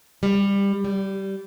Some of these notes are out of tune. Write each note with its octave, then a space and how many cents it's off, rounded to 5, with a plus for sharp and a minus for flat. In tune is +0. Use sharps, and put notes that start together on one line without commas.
G3 +20
G3 -15